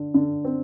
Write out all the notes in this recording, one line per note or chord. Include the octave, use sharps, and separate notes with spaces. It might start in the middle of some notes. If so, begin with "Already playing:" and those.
Already playing: D3
D3
C4